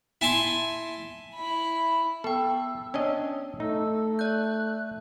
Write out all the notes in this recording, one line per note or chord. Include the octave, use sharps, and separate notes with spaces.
E4 G#5 A5 C6
E4 B5
B3 A4 G5 E6
C#4 D4 D#5
A3 D#4 E6
D5 F#6 G6